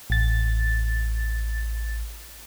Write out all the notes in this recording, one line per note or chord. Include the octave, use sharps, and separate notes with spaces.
A1 A6